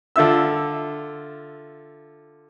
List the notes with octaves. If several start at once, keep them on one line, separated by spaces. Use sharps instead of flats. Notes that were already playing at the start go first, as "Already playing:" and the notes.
D3 F4 E5 E6